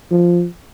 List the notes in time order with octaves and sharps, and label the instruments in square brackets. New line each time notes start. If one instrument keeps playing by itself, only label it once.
[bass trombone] F3